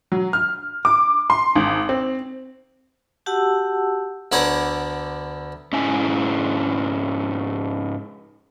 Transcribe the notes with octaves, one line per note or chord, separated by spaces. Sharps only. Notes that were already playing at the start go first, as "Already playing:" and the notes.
F#3
F6
D6
C6
G#1
C4
F#4 G4 F#5 A5 E6
D2 D3 B3 C#5 D5 A#5
G#2 C#4 E4 G#5